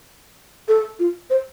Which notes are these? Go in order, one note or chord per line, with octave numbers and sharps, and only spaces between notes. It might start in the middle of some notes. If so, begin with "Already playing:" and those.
A4
F4
C5